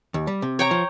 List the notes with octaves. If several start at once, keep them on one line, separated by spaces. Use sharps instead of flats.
D#2
G3
C3
C#5 G5 A#5
F3